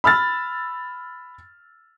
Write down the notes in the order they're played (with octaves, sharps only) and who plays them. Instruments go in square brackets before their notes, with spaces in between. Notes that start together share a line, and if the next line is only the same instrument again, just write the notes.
[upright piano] B5 E6 F6 A6